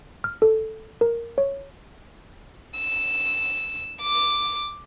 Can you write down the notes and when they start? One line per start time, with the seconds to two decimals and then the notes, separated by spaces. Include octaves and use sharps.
0.24 F6
0.42 A4
1.01 A#4
1.38 C#5
2.77 E6
4.02 D6